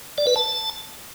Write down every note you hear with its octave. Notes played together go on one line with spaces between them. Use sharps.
D5
B4
A5